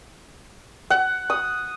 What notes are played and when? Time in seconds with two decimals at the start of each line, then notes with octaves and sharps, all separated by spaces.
0.90 F#5
1.30 D#6